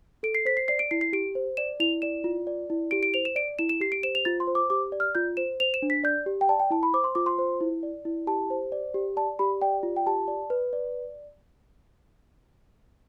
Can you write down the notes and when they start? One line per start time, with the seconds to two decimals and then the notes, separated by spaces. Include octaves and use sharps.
0.23 A4 D7
0.35 C7
0.45 C5 B6
0.57 C7
0.68 D5 C7
0.79 D7
0.91 E4 C7
1.01 C7
1.13 G4 D7
1.35 C5
1.57 D5 E7
1.80 E4 F7
2.02 D5 E7
2.24 F4
2.47 D5
2.70 E4
2.91 G4 D7
3.03 D7
3.14 C5 F7
3.25 E7
3.36 D5 D7
3.59 E4 E7
3.69 E7
3.80 G4 C7
3.92 D7
4.03 C5 E7
4.15 F7
4.25 F4 A6
4.40 C6
4.47 C5
4.55 D6
4.70 G4 D6
4.92 D5
5.00 F6
5.15 F4 G6
5.37 C5 E7
5.60 C5 F7
5.74 E7
5.82 D4
5.90 B6
6.04 D5 G6
6.26 G4
6.41 G5
6.49 D5 A5
6.60 G5
6.70 E4 A5
6.83 B5
6.94 C5 D6
7.04 C6
7.15 F4 D6
7.26 C6
7.38 C5
7.61 E4
7.83 D5
8.05 E4
8.27 G4 A5
8.50 C5
8.72 D5
8.94 G4
9.17 D5 A5
9.39 G4 B5
9.62 D5 G5
9.83 F4
9.96 G5
10.06 G4 A5
10.28 D5
10.50 B4
10.73 D5